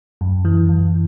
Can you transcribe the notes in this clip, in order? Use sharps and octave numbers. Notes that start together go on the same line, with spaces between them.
F#2
E3
F#2